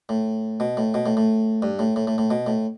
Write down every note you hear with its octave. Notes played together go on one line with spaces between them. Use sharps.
A2
B2
A2
B2
A2
A2
G2
A2
A2
A2
A2
B2
A2